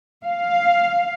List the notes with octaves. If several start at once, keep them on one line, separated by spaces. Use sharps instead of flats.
F5